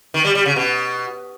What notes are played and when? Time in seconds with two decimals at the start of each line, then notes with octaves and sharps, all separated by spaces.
0.14 D#3
0.25 G3
0.35 G3
0.46 C#3
0.56 B2